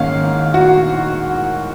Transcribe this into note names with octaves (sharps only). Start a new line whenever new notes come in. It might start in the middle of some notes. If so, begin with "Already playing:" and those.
Already playing: G#2 D#3 A#3 C#4 F5
F#4